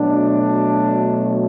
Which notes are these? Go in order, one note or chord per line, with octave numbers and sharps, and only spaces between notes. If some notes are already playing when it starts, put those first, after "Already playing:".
Already playing: B2 F#3 A3 D4